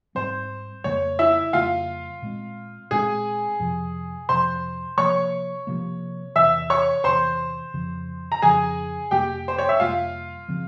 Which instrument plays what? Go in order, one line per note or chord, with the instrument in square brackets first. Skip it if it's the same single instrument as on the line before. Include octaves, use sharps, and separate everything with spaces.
[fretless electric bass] G#2 G3 C4 [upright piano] C5
[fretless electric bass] F2 C#3 G3 A#3 [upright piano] C#5
[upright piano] E4 E5
[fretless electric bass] F2 C#3 G3 A#3 [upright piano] F4 F5
[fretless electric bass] A#2 G#3 C4
[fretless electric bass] A#2 G#3 C4 [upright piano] G#4 G#5
[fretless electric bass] F2 C3 F3
[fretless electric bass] F2 C3 F3 [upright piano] C5 C6
[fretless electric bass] C3 F3 A#3 [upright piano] C#5 C#6
[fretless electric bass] C3 F3 A#3
[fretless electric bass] E2 C3 E3 [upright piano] E5 E6
[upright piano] C#5 C#6
[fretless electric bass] E2 C3 E3 [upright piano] C5 C6
[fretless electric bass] F2 C#3 F3
[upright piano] A#5
[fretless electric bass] F2 C#3 F3 [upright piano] G#4 G#5
[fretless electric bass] F2 C3 G3 A#3 [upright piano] G4 G5
[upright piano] C5
C#5
E5
[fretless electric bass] F2 C3 G3 A#3 [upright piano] F4 F5
[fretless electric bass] C#3 F3 C4